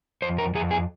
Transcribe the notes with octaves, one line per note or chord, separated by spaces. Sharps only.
F2 C5
A#4
F2 G#4
G#4